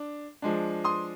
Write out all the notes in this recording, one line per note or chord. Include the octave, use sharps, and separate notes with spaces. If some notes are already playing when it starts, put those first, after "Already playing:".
Already playing: D4
F3 G#3 D4
C6 D#6